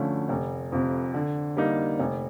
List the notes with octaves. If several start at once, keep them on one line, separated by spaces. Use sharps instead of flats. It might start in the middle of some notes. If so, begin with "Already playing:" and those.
Already playing: D2 D3 F3 A3 C#4
F1
F2 C3
D3
G3 A#3 D#4
F1